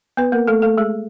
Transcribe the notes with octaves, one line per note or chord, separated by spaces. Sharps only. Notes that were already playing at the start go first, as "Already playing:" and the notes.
B3 B4
A#3 A#4
A3 A4
A3 A4
G#3 G#4